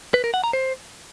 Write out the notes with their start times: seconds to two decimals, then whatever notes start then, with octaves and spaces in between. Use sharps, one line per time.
0.14 B4
0.24 A#4
0.34 F#5
0.44 A#5
0.53 C5